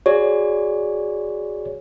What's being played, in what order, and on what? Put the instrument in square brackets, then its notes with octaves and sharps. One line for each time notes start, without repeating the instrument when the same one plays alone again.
[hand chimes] F#4 G#4 D5 [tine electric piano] C#5